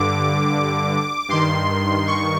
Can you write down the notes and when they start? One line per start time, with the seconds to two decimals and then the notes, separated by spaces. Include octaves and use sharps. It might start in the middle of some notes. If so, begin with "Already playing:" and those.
Already playing: G2 D3 D6
1.29 G2 D#3 C6
2.07 C#6